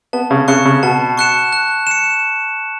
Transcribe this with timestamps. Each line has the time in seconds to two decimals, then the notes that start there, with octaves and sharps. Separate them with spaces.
0.13 B3 A5
0.31 C#3
0.48 C#3 C#6 F#6 C#7 E7
0.65 C#3
0.83 B2 A5
1.17 C#6 F#6 C#7 E7
1.53 F#6
1.87 C#7 E7